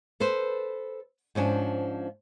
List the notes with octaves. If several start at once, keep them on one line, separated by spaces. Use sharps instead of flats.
A4 B4 C5
G#2 F3 C#4 D4